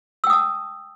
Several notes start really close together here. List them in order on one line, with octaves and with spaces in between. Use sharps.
E6 G5 D#6 A5